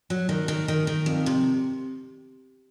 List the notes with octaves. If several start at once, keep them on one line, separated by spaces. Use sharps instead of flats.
F#3
D#3
D#3
D#3
D#3
F2
C3